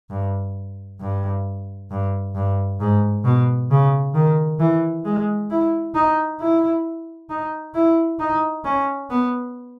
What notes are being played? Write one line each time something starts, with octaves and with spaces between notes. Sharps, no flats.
G2
G2
G2
G2
G#2
B2
C#3
D#3
E3
G#3
E4
D#4
E4
D#4
E4
D#4
C#4
B3